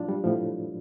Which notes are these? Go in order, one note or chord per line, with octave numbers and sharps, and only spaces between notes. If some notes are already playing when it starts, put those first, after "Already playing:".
Already playing: A2 F3 D4 F4
G3
A2 F3